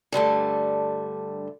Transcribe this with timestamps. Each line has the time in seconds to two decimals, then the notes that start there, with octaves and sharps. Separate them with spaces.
0.12 G2 D3 G3 A3